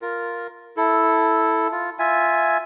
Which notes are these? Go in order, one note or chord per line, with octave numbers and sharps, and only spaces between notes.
F4 A#4
E4 A4
F4
F4 E5 G#5